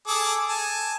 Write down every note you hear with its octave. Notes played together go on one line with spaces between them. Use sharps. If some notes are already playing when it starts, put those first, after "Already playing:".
G#4 A4 D6
G#5 A5